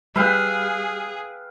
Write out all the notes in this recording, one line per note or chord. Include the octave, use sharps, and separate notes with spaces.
G3 G#4 B4 F5 G5 E6 F#6